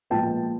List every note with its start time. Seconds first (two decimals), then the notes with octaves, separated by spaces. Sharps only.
0.10 A#2 F3 G#3 B3 G5 A5